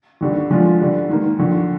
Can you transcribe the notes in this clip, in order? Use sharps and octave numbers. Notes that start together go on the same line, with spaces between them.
D#2 D3 G3
D3 F3 G#3 D4 F4
D3 G3 D4
G#2 D#3 A#3
D#2 D3 F3